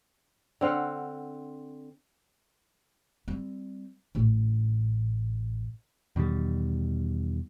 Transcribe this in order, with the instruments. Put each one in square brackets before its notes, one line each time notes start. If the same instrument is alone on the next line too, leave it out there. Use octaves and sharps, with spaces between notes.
[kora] D3 C4 F5 F#5
[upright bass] G3 C4
A1 A2
[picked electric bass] E2 B2 D#3 G3